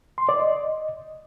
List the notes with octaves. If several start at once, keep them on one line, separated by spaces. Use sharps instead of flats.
C6
D5
D#5